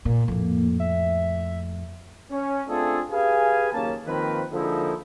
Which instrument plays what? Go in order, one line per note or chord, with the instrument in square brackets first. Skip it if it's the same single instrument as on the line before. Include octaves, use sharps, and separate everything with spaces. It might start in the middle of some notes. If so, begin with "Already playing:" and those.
[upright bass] A#2 [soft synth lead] A#3
[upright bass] F2 A2
[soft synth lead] E5
[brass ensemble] C#4
A3 C4 D4 F4 G#4 A4
G4 G#4 B4 F5 G#5
F#1 D#2 A#3 C#4 A5
D#3 F3 A#3 C4 A#4 B4
D3 F3 G#3 A#3 D#4 E4